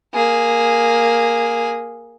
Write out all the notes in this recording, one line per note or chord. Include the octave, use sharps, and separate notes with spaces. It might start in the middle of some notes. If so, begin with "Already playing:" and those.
A#3 G#4